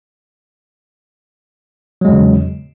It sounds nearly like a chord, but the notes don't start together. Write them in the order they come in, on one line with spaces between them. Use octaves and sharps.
F#3 G#3 E2 C#3